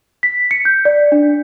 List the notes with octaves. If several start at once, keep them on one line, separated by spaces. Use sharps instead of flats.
B6
C#7
G6
D5
D4